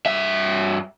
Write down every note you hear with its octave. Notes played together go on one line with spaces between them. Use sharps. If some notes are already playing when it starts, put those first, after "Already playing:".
G2 E5